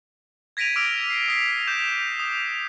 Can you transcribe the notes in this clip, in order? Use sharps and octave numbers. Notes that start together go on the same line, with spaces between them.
G#6 A#6 B6 D7 D#7 F7
D6 E6 F6 D7 D#7 F7
C7
D#6 B6 C7
D6 G6 E7
D#6